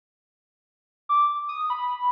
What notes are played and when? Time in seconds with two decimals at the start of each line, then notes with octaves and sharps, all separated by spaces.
1.09 D6
1.49 D#6
1.70 B5